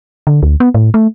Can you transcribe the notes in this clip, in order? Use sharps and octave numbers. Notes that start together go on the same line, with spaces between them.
D3
D2
B3
A2
A3